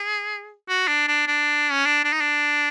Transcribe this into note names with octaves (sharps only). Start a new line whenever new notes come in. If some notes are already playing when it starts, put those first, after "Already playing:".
Already playing: G#4
F#4
D4
D4
D4
C#4
D4
D4
D#4
D4